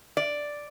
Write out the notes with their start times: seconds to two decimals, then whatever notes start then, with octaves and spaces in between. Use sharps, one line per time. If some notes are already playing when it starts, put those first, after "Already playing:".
0.17 D5